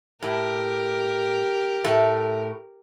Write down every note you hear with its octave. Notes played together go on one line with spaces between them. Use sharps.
A2 G4 A#4
A2 A3